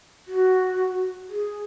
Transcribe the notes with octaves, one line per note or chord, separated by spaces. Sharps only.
F#4
G#4